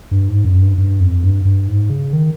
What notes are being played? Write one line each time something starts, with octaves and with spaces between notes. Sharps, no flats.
G2
G#2
F#2
G2
G2
F2
G2
G2
G#2
C#3
D#3